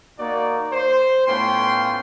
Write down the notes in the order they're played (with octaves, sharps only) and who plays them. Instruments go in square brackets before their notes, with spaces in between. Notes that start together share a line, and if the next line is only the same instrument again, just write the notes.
[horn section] A#3 D#4 F#4 D5
C5
A2 B3 C#4 F4 G5 C6